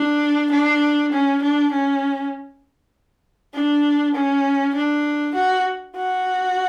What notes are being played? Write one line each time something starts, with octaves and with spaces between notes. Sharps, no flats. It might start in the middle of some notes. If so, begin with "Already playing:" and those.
Already playing: D4
D4
C#4
D4
C#4
D4
C#4
D4
F#4
F#4